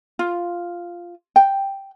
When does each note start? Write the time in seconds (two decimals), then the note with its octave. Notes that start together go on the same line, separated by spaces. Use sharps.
0.19 F4
1.36 G5